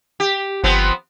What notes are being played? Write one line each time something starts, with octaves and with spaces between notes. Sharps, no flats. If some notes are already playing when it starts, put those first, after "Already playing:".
G4
G1 F3 B3 C4